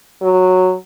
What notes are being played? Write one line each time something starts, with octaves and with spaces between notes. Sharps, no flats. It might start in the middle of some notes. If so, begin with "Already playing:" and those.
F#3